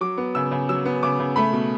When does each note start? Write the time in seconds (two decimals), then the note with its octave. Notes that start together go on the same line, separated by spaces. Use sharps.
0.01 F#3 D6
0.18 B3
0.35 C#3 E6
0.51 C#3
0.69 F#3 E6
0.85 B3
1.03 C#3 D6
1.19 C#3
1.36 A3 B5
1.53 B2